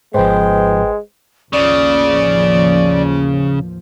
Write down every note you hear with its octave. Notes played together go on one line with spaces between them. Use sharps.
G#1 G#2 F3 G#3 B4 C5 G5
A1 D#2 C#3 F3 D5